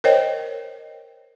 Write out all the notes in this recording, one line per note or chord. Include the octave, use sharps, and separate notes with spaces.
A#4 C5 C#5 D#5 G5